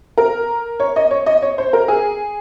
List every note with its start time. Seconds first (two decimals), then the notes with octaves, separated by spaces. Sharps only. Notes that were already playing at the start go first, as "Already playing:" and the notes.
0.18 A#4
0.80 C#5
0.96 D#5
1.11 C#5
1.26 D#5
1.42 C#5
1.58 C5
1.73 A#4
1.88 G#4